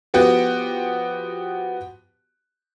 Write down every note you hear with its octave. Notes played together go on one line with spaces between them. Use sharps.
F3 B3 F#4 G4